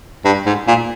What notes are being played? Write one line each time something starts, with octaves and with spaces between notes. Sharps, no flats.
G2
G#2
A#2